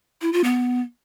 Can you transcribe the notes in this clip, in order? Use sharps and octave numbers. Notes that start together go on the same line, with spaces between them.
E4
F4
B3